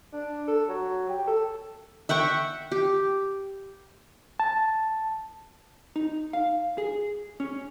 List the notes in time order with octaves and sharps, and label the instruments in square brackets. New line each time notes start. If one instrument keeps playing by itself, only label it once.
[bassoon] D4
A4
F#3
G4
A4
[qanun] E5 F#5 G5 C#6
G4
[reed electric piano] A5
[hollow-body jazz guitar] D#4
F5
G#4
C#4